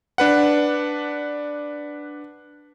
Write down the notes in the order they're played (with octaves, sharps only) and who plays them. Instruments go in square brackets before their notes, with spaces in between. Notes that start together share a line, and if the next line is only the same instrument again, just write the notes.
[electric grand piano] D4 B4 F#5